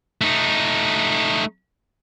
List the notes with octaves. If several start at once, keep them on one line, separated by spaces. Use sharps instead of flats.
A3 D#4